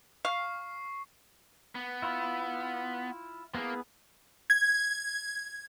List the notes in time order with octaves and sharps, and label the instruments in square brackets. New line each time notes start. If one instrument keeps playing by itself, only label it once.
[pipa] F5 [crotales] C#6 C7
[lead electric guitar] B3
[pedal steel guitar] E4 F4
[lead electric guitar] A#3 [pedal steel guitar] B3 E4 G#4
[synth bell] G#6